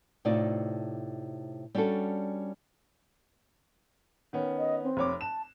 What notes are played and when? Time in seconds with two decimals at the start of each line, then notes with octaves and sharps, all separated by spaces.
0.25 A2 C3 D#4 F4 D5
1.75 G3 C#4 D4 F#4 A4
4.33 D#3 B3 C#4
4.58 D#5
4.83 C4
4.97 F1 C#5 D6
5.21 A5 E7